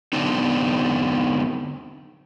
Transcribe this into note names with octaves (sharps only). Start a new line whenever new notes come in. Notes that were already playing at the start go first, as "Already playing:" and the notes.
D3 F#3 B3 C4 D4 D#4